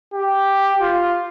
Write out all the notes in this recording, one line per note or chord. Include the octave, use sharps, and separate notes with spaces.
G4
F4